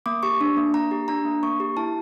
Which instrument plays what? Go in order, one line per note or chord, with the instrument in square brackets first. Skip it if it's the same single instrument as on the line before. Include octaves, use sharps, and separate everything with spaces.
[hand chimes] A#3 D6
G4 C#6
D4
A#3
A#3 A#5
G4
D4 A#5
A#3
A#3 C#6
G4
E4 A5